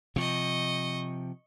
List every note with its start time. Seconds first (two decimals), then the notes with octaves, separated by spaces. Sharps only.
0.16 C3 F3 D#5 C#6